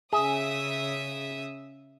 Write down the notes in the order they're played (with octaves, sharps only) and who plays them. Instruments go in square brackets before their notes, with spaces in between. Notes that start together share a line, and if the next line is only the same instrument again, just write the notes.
[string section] C#3 E5 D#6 [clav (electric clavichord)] G#4